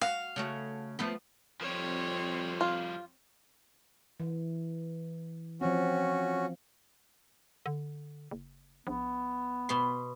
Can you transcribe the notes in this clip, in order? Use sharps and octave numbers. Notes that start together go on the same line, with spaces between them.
F#4 F5
C#3 A3 F#4
F3 A3 B3
F2 F3 G3 C4 C#5
F4
E3
F3 C4 C#4 F#4
D3
F#1
A#1 B3
B2 B5 C6